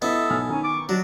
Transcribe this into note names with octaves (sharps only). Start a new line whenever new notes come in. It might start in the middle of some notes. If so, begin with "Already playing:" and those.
B3 E4 A4 D#5 E5 D#6
B1 G#5 F6
D#3 C#4 G#5 A#5
C#6 D6
F#3 D4 F#4 D5 D#5